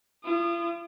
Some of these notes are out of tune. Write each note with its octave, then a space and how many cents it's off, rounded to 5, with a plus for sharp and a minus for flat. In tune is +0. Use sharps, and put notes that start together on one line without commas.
F4 -45 D#6 -25